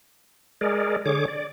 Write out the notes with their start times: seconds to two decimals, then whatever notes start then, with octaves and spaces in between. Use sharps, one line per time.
0.61 G#3 G#4 A#4 D5
1.06 D3 G#4 C#5 D6
1.28 D5